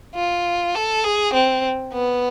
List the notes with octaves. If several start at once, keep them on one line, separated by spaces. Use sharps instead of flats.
F4
A4
G#4
C4
B3